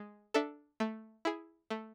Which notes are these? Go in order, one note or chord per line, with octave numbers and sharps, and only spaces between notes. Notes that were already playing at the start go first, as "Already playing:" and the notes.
Already playing: G#3
D4 A4 E5
A3
E4 G#4
A3